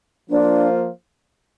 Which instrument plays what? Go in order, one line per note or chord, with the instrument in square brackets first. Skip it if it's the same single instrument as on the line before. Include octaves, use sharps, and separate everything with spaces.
[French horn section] F3 A#3 F4 C5 [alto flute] D4